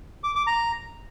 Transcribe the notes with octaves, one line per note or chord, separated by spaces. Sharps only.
D6
D6
A#5